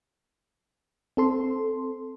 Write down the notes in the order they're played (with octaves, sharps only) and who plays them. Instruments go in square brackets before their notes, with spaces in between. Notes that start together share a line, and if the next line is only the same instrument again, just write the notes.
[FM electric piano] C4 A4 C6